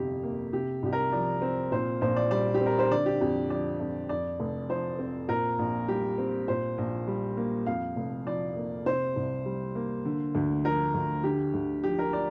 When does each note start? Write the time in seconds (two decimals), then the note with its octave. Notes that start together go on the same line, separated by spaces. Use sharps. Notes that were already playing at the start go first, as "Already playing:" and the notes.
Already playing: G1 F2 C3 G4
0.23 A#3
0.53 C3 G4
0.83 C2 G4
0.93 A#4
1.12 F3 D5
1.42 C4
1.72 A#2 C5
2.01 A#1 C5
2.16 D5
2.31 G3 D5
2.54 G4
2.61 C4
2.66 A#4
2.79 C5
2.91 D3 D5
3.06 G4
3.21 F2 G4
3.50 F3 D5
3.80 F2
4.09 F2 D5
4.40 F1
4.69 F3 C5
4.99 C4
5.28 A#2 A#4
5.59 A#1
5.88 G3 G4
6.18 C4
6.48 A#2 C5
6.78 A#1
7.08 G3
7.37 A#3
7.66 F2 F5
7.96 F1
8.26 F3 D5
8.57 A#3
8.85 C3 C5
9.16 C2
9.45 G3
9.75 A#3
10.05 D3
10.35 D2
10.65 F3 A#4
10.94 D2
11.23 D3 G4
11.54 D2
11.84 F3 G4
11.99 A#4
12.13 D5